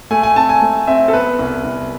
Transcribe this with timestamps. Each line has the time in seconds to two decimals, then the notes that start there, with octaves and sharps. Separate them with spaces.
0.11 A3 G#5
0.23 G#5
0.36 C4 A5
0.49 G#5
0.62 A3
0.87 C4 E5
1.08 A4
1.13 B3 B4
1.39 C2
1.64 C2